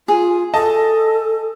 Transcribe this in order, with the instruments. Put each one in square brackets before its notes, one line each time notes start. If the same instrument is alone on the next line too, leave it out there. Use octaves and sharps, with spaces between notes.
[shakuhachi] F4 [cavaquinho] G#4
[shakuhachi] A4 [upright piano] D#5 A5